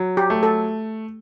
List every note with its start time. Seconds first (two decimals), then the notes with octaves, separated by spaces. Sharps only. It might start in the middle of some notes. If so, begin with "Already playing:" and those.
Already playing: F#3
0.17 G4
0.30 A3
0.43 A4